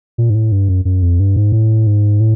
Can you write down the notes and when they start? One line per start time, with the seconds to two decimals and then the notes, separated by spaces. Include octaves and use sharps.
0.18 A#2
0.30 G#2
0.35 A2
0.52 G2
0.68 F#2
0.85 F#2
1.02 F2
1.20 G2
1.36 G#2
1.52 A2
1.87 G#2
2.20 A2